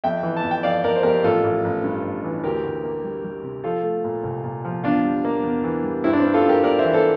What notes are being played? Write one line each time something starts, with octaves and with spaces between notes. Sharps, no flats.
F2 E5 G5
E3
A5
F2
G5
F2 D5 F5
F2 A#4 D5
C5
F2 G4 A#4
A1 F4 A4
A1
A1
G2
A1
E3
D2 G4 A#4
D2
A#3
G3
G3
C3
F3 F4 A4
A3
A#2
C2
A#2
F3
E2 D4 F4
G3
A#3
E2
E3
G3
G2 C4 E4
D4
C4
G2
F4 A4
G2
G4 A#4
A#3 A#4 D5
C5 E5
E3
A4 C5